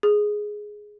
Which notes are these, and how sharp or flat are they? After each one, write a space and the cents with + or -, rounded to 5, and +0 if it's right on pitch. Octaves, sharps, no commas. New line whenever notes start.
G#4 +5